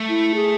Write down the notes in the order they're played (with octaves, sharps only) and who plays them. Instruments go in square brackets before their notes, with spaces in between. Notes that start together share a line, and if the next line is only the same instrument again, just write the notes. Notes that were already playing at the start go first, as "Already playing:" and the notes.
Already playing: [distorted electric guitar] A3
[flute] E4
G#4